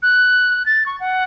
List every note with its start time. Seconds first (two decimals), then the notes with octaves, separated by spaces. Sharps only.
0.03 F#6
0.66 A6
0.86 C#6
1.00 F#5